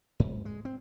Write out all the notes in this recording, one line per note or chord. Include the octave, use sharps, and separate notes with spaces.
G#2
G#3
C4